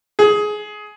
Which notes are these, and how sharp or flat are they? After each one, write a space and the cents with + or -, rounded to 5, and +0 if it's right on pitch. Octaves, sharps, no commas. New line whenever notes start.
G#4 +20